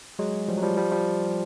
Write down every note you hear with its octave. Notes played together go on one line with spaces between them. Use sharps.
F#3 G#3
F3 G3
F#3
F3 G3
F3 G3
F3 G3